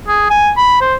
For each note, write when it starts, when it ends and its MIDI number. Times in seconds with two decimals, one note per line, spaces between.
0.08 0.30 68
0.30 0.51 80
0.57 0.80 83
0.81 0.95 72